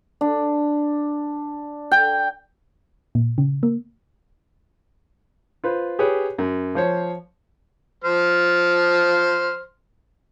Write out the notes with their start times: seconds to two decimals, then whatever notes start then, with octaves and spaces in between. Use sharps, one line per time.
0.21 D4
1.91 G5
3.15 A#2
3.38 C#3
3.63 A#3
5.64 F4 B4 C5
5.99 G4 G#4 B4 C#5
6.38 F#2
6.75 F3 C5 C#5
8.04 F3 C5 F6